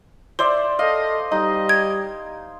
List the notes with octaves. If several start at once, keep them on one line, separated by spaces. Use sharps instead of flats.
C5 D5 E5 C6
A4 D#5 F5
G3 D#4 D#5
G#6